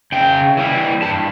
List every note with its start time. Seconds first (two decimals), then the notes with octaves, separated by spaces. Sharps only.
0.12 C#3 G5
0.57 E3 G3
1.02 G2 A5